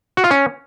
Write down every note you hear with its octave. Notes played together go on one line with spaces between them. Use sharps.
F#4
F4
C#4